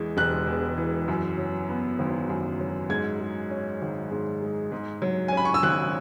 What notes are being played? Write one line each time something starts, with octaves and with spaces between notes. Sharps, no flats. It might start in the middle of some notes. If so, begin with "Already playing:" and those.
Already playing: E2 E3 G#3
E1 F#6
E2
E3
F#2
F#3
B3
G#1
F#2
F#3
G#2 G#6
G#3
C#4
G#1
G#2
G#3
G#2
F#3
G#5
C#4 B5
C#6
E6
G#1 F#6